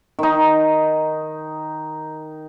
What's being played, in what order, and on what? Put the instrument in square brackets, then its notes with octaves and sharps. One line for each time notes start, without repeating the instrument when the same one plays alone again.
[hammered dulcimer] D#3 D#4